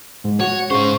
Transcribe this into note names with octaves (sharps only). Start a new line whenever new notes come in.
G#2
F#4 C#5
G#2 C#3 C5 C#6